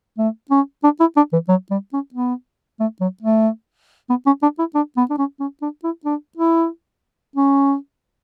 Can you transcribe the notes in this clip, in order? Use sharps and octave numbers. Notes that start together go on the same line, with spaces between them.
A3
C#4
D4
E4
D4
E3
F#3
G3
C#4
B3
A3
F#3
A3
B3
C#4
D4
E4
D4
B3
D4
C#4
C#4
D4
E4
D4
E4
C#4